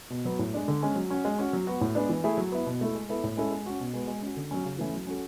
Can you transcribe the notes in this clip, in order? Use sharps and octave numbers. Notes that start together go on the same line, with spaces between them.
B2
F#3 B3
A2
G#3 D4
D3
G#3 C#4
F#3
C#4 F#4
G#3
C#4 F#4
F#3
B3 F#4
A2
G#3 B3 D4
E3
A3 E4 G#4
F#3
B3 E4
B2
A3 E4 A4
G#3
B3 E4 A4
A2
G#3 C#4 E4 A4
G#3
C#4 F#4
B2
G#3 B3 F#4
G#3
C#4 F#4
D3
F#3 C#4
C#3
E3 A3 C#4 E4
F#3
C#4 F#4 A4